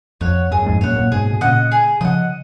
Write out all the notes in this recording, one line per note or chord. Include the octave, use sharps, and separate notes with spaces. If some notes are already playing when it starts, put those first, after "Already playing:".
F2 C#5 F#5
F#2 G#4
F#2
F2 G#2
F#2 A#2 C#5 F#5
F#2 A#2
G#2 B2 G#4
B2
A#2 C#3 D#5 F#5
G#4
C#3 F3 D#5 F#5